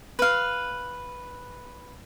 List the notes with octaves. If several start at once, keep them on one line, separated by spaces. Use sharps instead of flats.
B4 F5